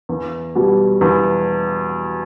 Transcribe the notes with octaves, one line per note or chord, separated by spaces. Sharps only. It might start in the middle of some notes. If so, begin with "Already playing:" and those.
E2
B2 G3
E2